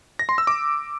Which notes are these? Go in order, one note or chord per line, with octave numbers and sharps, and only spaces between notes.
A#6
C6
E6
D6